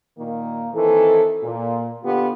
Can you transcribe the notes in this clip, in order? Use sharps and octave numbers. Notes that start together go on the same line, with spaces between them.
A#2 D#3 A#3
D#3 E3 C4 A4
A#2
D3 B3 F4 G4